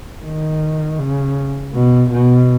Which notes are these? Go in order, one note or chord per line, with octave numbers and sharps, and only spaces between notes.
D#3
C#3
B2
B2